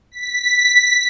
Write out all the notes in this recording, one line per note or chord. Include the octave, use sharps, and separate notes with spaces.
B6